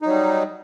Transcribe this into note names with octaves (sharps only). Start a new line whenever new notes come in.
F#3 G3 D#4